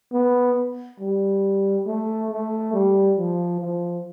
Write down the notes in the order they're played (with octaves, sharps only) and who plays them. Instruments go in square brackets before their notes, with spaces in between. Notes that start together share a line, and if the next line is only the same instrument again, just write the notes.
[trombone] B3
G3
A3
A3
G3
F3
F3